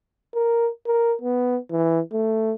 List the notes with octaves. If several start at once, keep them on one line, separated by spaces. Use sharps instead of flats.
A#4
A#4
B3
E3
A3